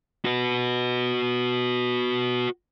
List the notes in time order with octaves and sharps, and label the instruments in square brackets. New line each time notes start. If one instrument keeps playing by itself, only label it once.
[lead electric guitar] F#4 B4